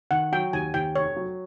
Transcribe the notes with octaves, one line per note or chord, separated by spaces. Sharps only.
D#3 F#5
F#3 G5
D#2 G#5
D#2 G5
F1 C#5
F#3